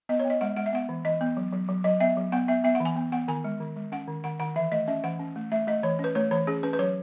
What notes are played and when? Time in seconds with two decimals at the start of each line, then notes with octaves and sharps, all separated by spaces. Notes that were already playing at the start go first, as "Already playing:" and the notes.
0.09 B3 D#5
0.20 C#5
0.25 B3
0.30 D#5
0.41 G#3 F#5
0.56 G#3 F#5
0.66 E5
0.73 B3 F#5
0.89 E3
1.05 E3 D#5
1.21 B3
1.37 F#3
1.52 F#3
1.69 F#3
1.84 F#3 D#5
2.00 B3 E5
2.17 F#3
2.32 B3 F#5
2.48 B3 E5
2.64 B3 E5
2.75 F#5
2.80 E3
2.85 G#5
2.96 B3
3.12 B3 F#5
3.28 D#3 G#5
3.44 G#3
3.60 D#3
3.76 G#3
3.92 C#4 F#5
4.08 D#3
4.24 D#3 F#5
4.40 D#3 F#5
4.56 E3 E5
4.72 A3 D#5
4.88 C#4 E5
5.04 E3 F#5
5.19 C#4
5.36 A3
5.52 A3 E5
5.67 A3 D#5
5.83 E3 C#5
5.99 C#4 B4
6.15 A3 C#5
6.31 E3 C#5
6.47 C#4 G#4
6.63 C#4 B4
6.73 B4
6.79 F#3 C#5